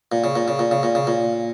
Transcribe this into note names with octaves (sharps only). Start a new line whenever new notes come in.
A#2
C#3
A#2
C#3
A#2
C#3
A#2
C#3
A#2